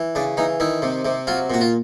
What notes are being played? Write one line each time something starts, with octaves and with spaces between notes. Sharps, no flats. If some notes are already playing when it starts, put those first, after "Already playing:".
Already playing: E3
C#3 D4
E3 D#4
D#3 E4
C3
C3
F#3 F4
A#2 F#4
F4